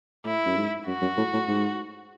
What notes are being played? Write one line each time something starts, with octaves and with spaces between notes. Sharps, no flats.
A2 E4
F#2
G#2
F#2 F#4
F#2
A2
A2
G#2